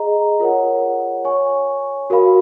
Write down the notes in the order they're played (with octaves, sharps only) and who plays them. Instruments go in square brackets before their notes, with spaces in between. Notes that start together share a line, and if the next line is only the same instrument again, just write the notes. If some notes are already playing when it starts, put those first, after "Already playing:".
Already playing: [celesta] G#4 D#5 A#5
F4 A#4 C#5 F#5
C#5 G#5 C#6
F#4 A#4 F5 B5